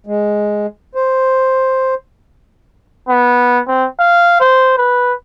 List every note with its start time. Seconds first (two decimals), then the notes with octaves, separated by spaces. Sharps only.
0.06 G#3
0.95 C5
3.09 B3
3.68 C4
3.99 F5
4.40 C5
4.78 B4